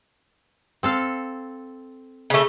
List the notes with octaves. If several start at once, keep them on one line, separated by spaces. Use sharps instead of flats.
C4 A4 F5
C#3 A3